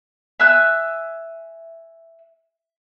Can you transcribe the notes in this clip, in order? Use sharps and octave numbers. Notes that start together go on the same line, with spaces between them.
E5 G#5 E6 F#6